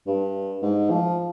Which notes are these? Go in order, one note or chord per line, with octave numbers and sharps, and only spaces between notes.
G2
G#2
F3